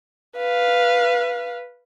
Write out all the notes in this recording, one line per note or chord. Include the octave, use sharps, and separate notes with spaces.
B4 F5